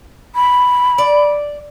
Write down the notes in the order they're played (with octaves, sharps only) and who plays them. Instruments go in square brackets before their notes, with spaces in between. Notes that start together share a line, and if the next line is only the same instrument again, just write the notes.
[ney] B5
[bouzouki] D5